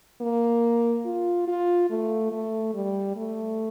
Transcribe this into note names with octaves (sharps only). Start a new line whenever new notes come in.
A#3
F4
F4
A3
A3
G3
A3